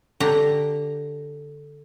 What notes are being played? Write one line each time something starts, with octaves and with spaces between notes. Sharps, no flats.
D3 G4 A#5